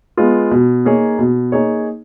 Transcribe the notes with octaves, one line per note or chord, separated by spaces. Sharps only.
G#3 B3 F4
B2
A#3 D#4 G#4 C#5
B2
A#3 D#4 G#4 C#5